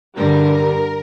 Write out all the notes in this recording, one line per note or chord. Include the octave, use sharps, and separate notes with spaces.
G2 D3 G3 A#4